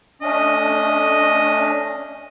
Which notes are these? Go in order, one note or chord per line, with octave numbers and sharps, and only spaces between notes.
A3 C#4 D4 D#5